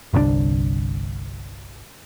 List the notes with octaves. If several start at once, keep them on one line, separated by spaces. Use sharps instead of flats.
G1 C2 C3 D4